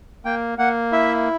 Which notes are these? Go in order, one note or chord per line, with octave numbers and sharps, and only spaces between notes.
A#3 G5
A#3 F#5
E4 E5